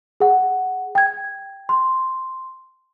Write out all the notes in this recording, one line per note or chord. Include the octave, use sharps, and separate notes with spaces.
G#4 F#5
G5 G#6
C6